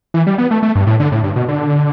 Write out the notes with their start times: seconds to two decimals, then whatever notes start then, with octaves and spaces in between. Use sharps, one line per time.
0.14 E3
0.27 G3
0.38 B3
0.51 A3
0.63 A3
0.75 G2
0.87 A2
1.00 D3
1.12 A2
1.24 G2
1.36 B2
1.48 D3